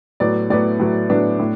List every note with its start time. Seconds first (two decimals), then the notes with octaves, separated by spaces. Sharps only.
0.20 A2 F#3 B3 D5
0.50 A2 F#3 B3 D5
0.79 A2 F#3 B3
1.09 A2 F#3 B3 D4
1.39 A2